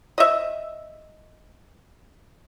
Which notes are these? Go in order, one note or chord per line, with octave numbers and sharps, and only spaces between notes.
D#5 E5